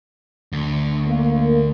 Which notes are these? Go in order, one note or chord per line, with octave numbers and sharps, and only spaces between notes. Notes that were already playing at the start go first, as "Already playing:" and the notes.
D2
A#3